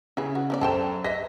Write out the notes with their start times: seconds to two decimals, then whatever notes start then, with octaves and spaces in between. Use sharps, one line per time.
0.17 C#3 E4 G#4 B4
0.35 F#4
0.50 F3 B3 D5
0.61 F#2 A4 C5 G5 A5 E7
1.04 B4 D#5 E5 A#6 B6